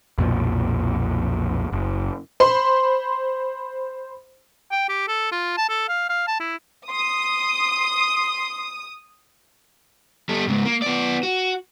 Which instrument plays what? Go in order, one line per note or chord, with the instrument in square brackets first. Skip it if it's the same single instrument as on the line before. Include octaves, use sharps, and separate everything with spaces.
[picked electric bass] B1 F2 A#2 F3
F#1
[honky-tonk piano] C5 B5 C6
[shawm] G5
G4
A4
F4
A5
A4
F5
F5
A5
E4
[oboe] C6 [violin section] D#6
[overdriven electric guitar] G3 A4
G#2 C#3
A#3
B3 D5
F#4